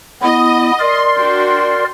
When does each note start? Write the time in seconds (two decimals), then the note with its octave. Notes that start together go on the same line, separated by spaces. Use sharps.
0.23 B3 E4 D#5
0.80 A#4 D5 C6
1.17 D4 F#4 G5